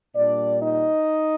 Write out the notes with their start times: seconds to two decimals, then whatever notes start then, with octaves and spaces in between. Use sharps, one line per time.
0.15 A#2 G3 D4 D5
0.62 D#4 D#5